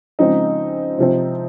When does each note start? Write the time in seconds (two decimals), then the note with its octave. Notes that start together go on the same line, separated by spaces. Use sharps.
0.19 C#3 F3 G#3 C4 D#4
0.98 C3 F3 C4